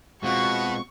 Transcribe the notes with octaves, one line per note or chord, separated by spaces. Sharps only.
B2 G#3 C4 F4 F#4 C#6